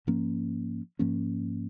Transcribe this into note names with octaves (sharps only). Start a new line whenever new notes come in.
G#2 F3 A#3 C#4
G#2 F3 A#3 C#4